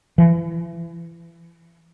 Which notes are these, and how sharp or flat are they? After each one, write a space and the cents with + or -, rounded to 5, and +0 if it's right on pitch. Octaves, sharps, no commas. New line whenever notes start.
E3 +30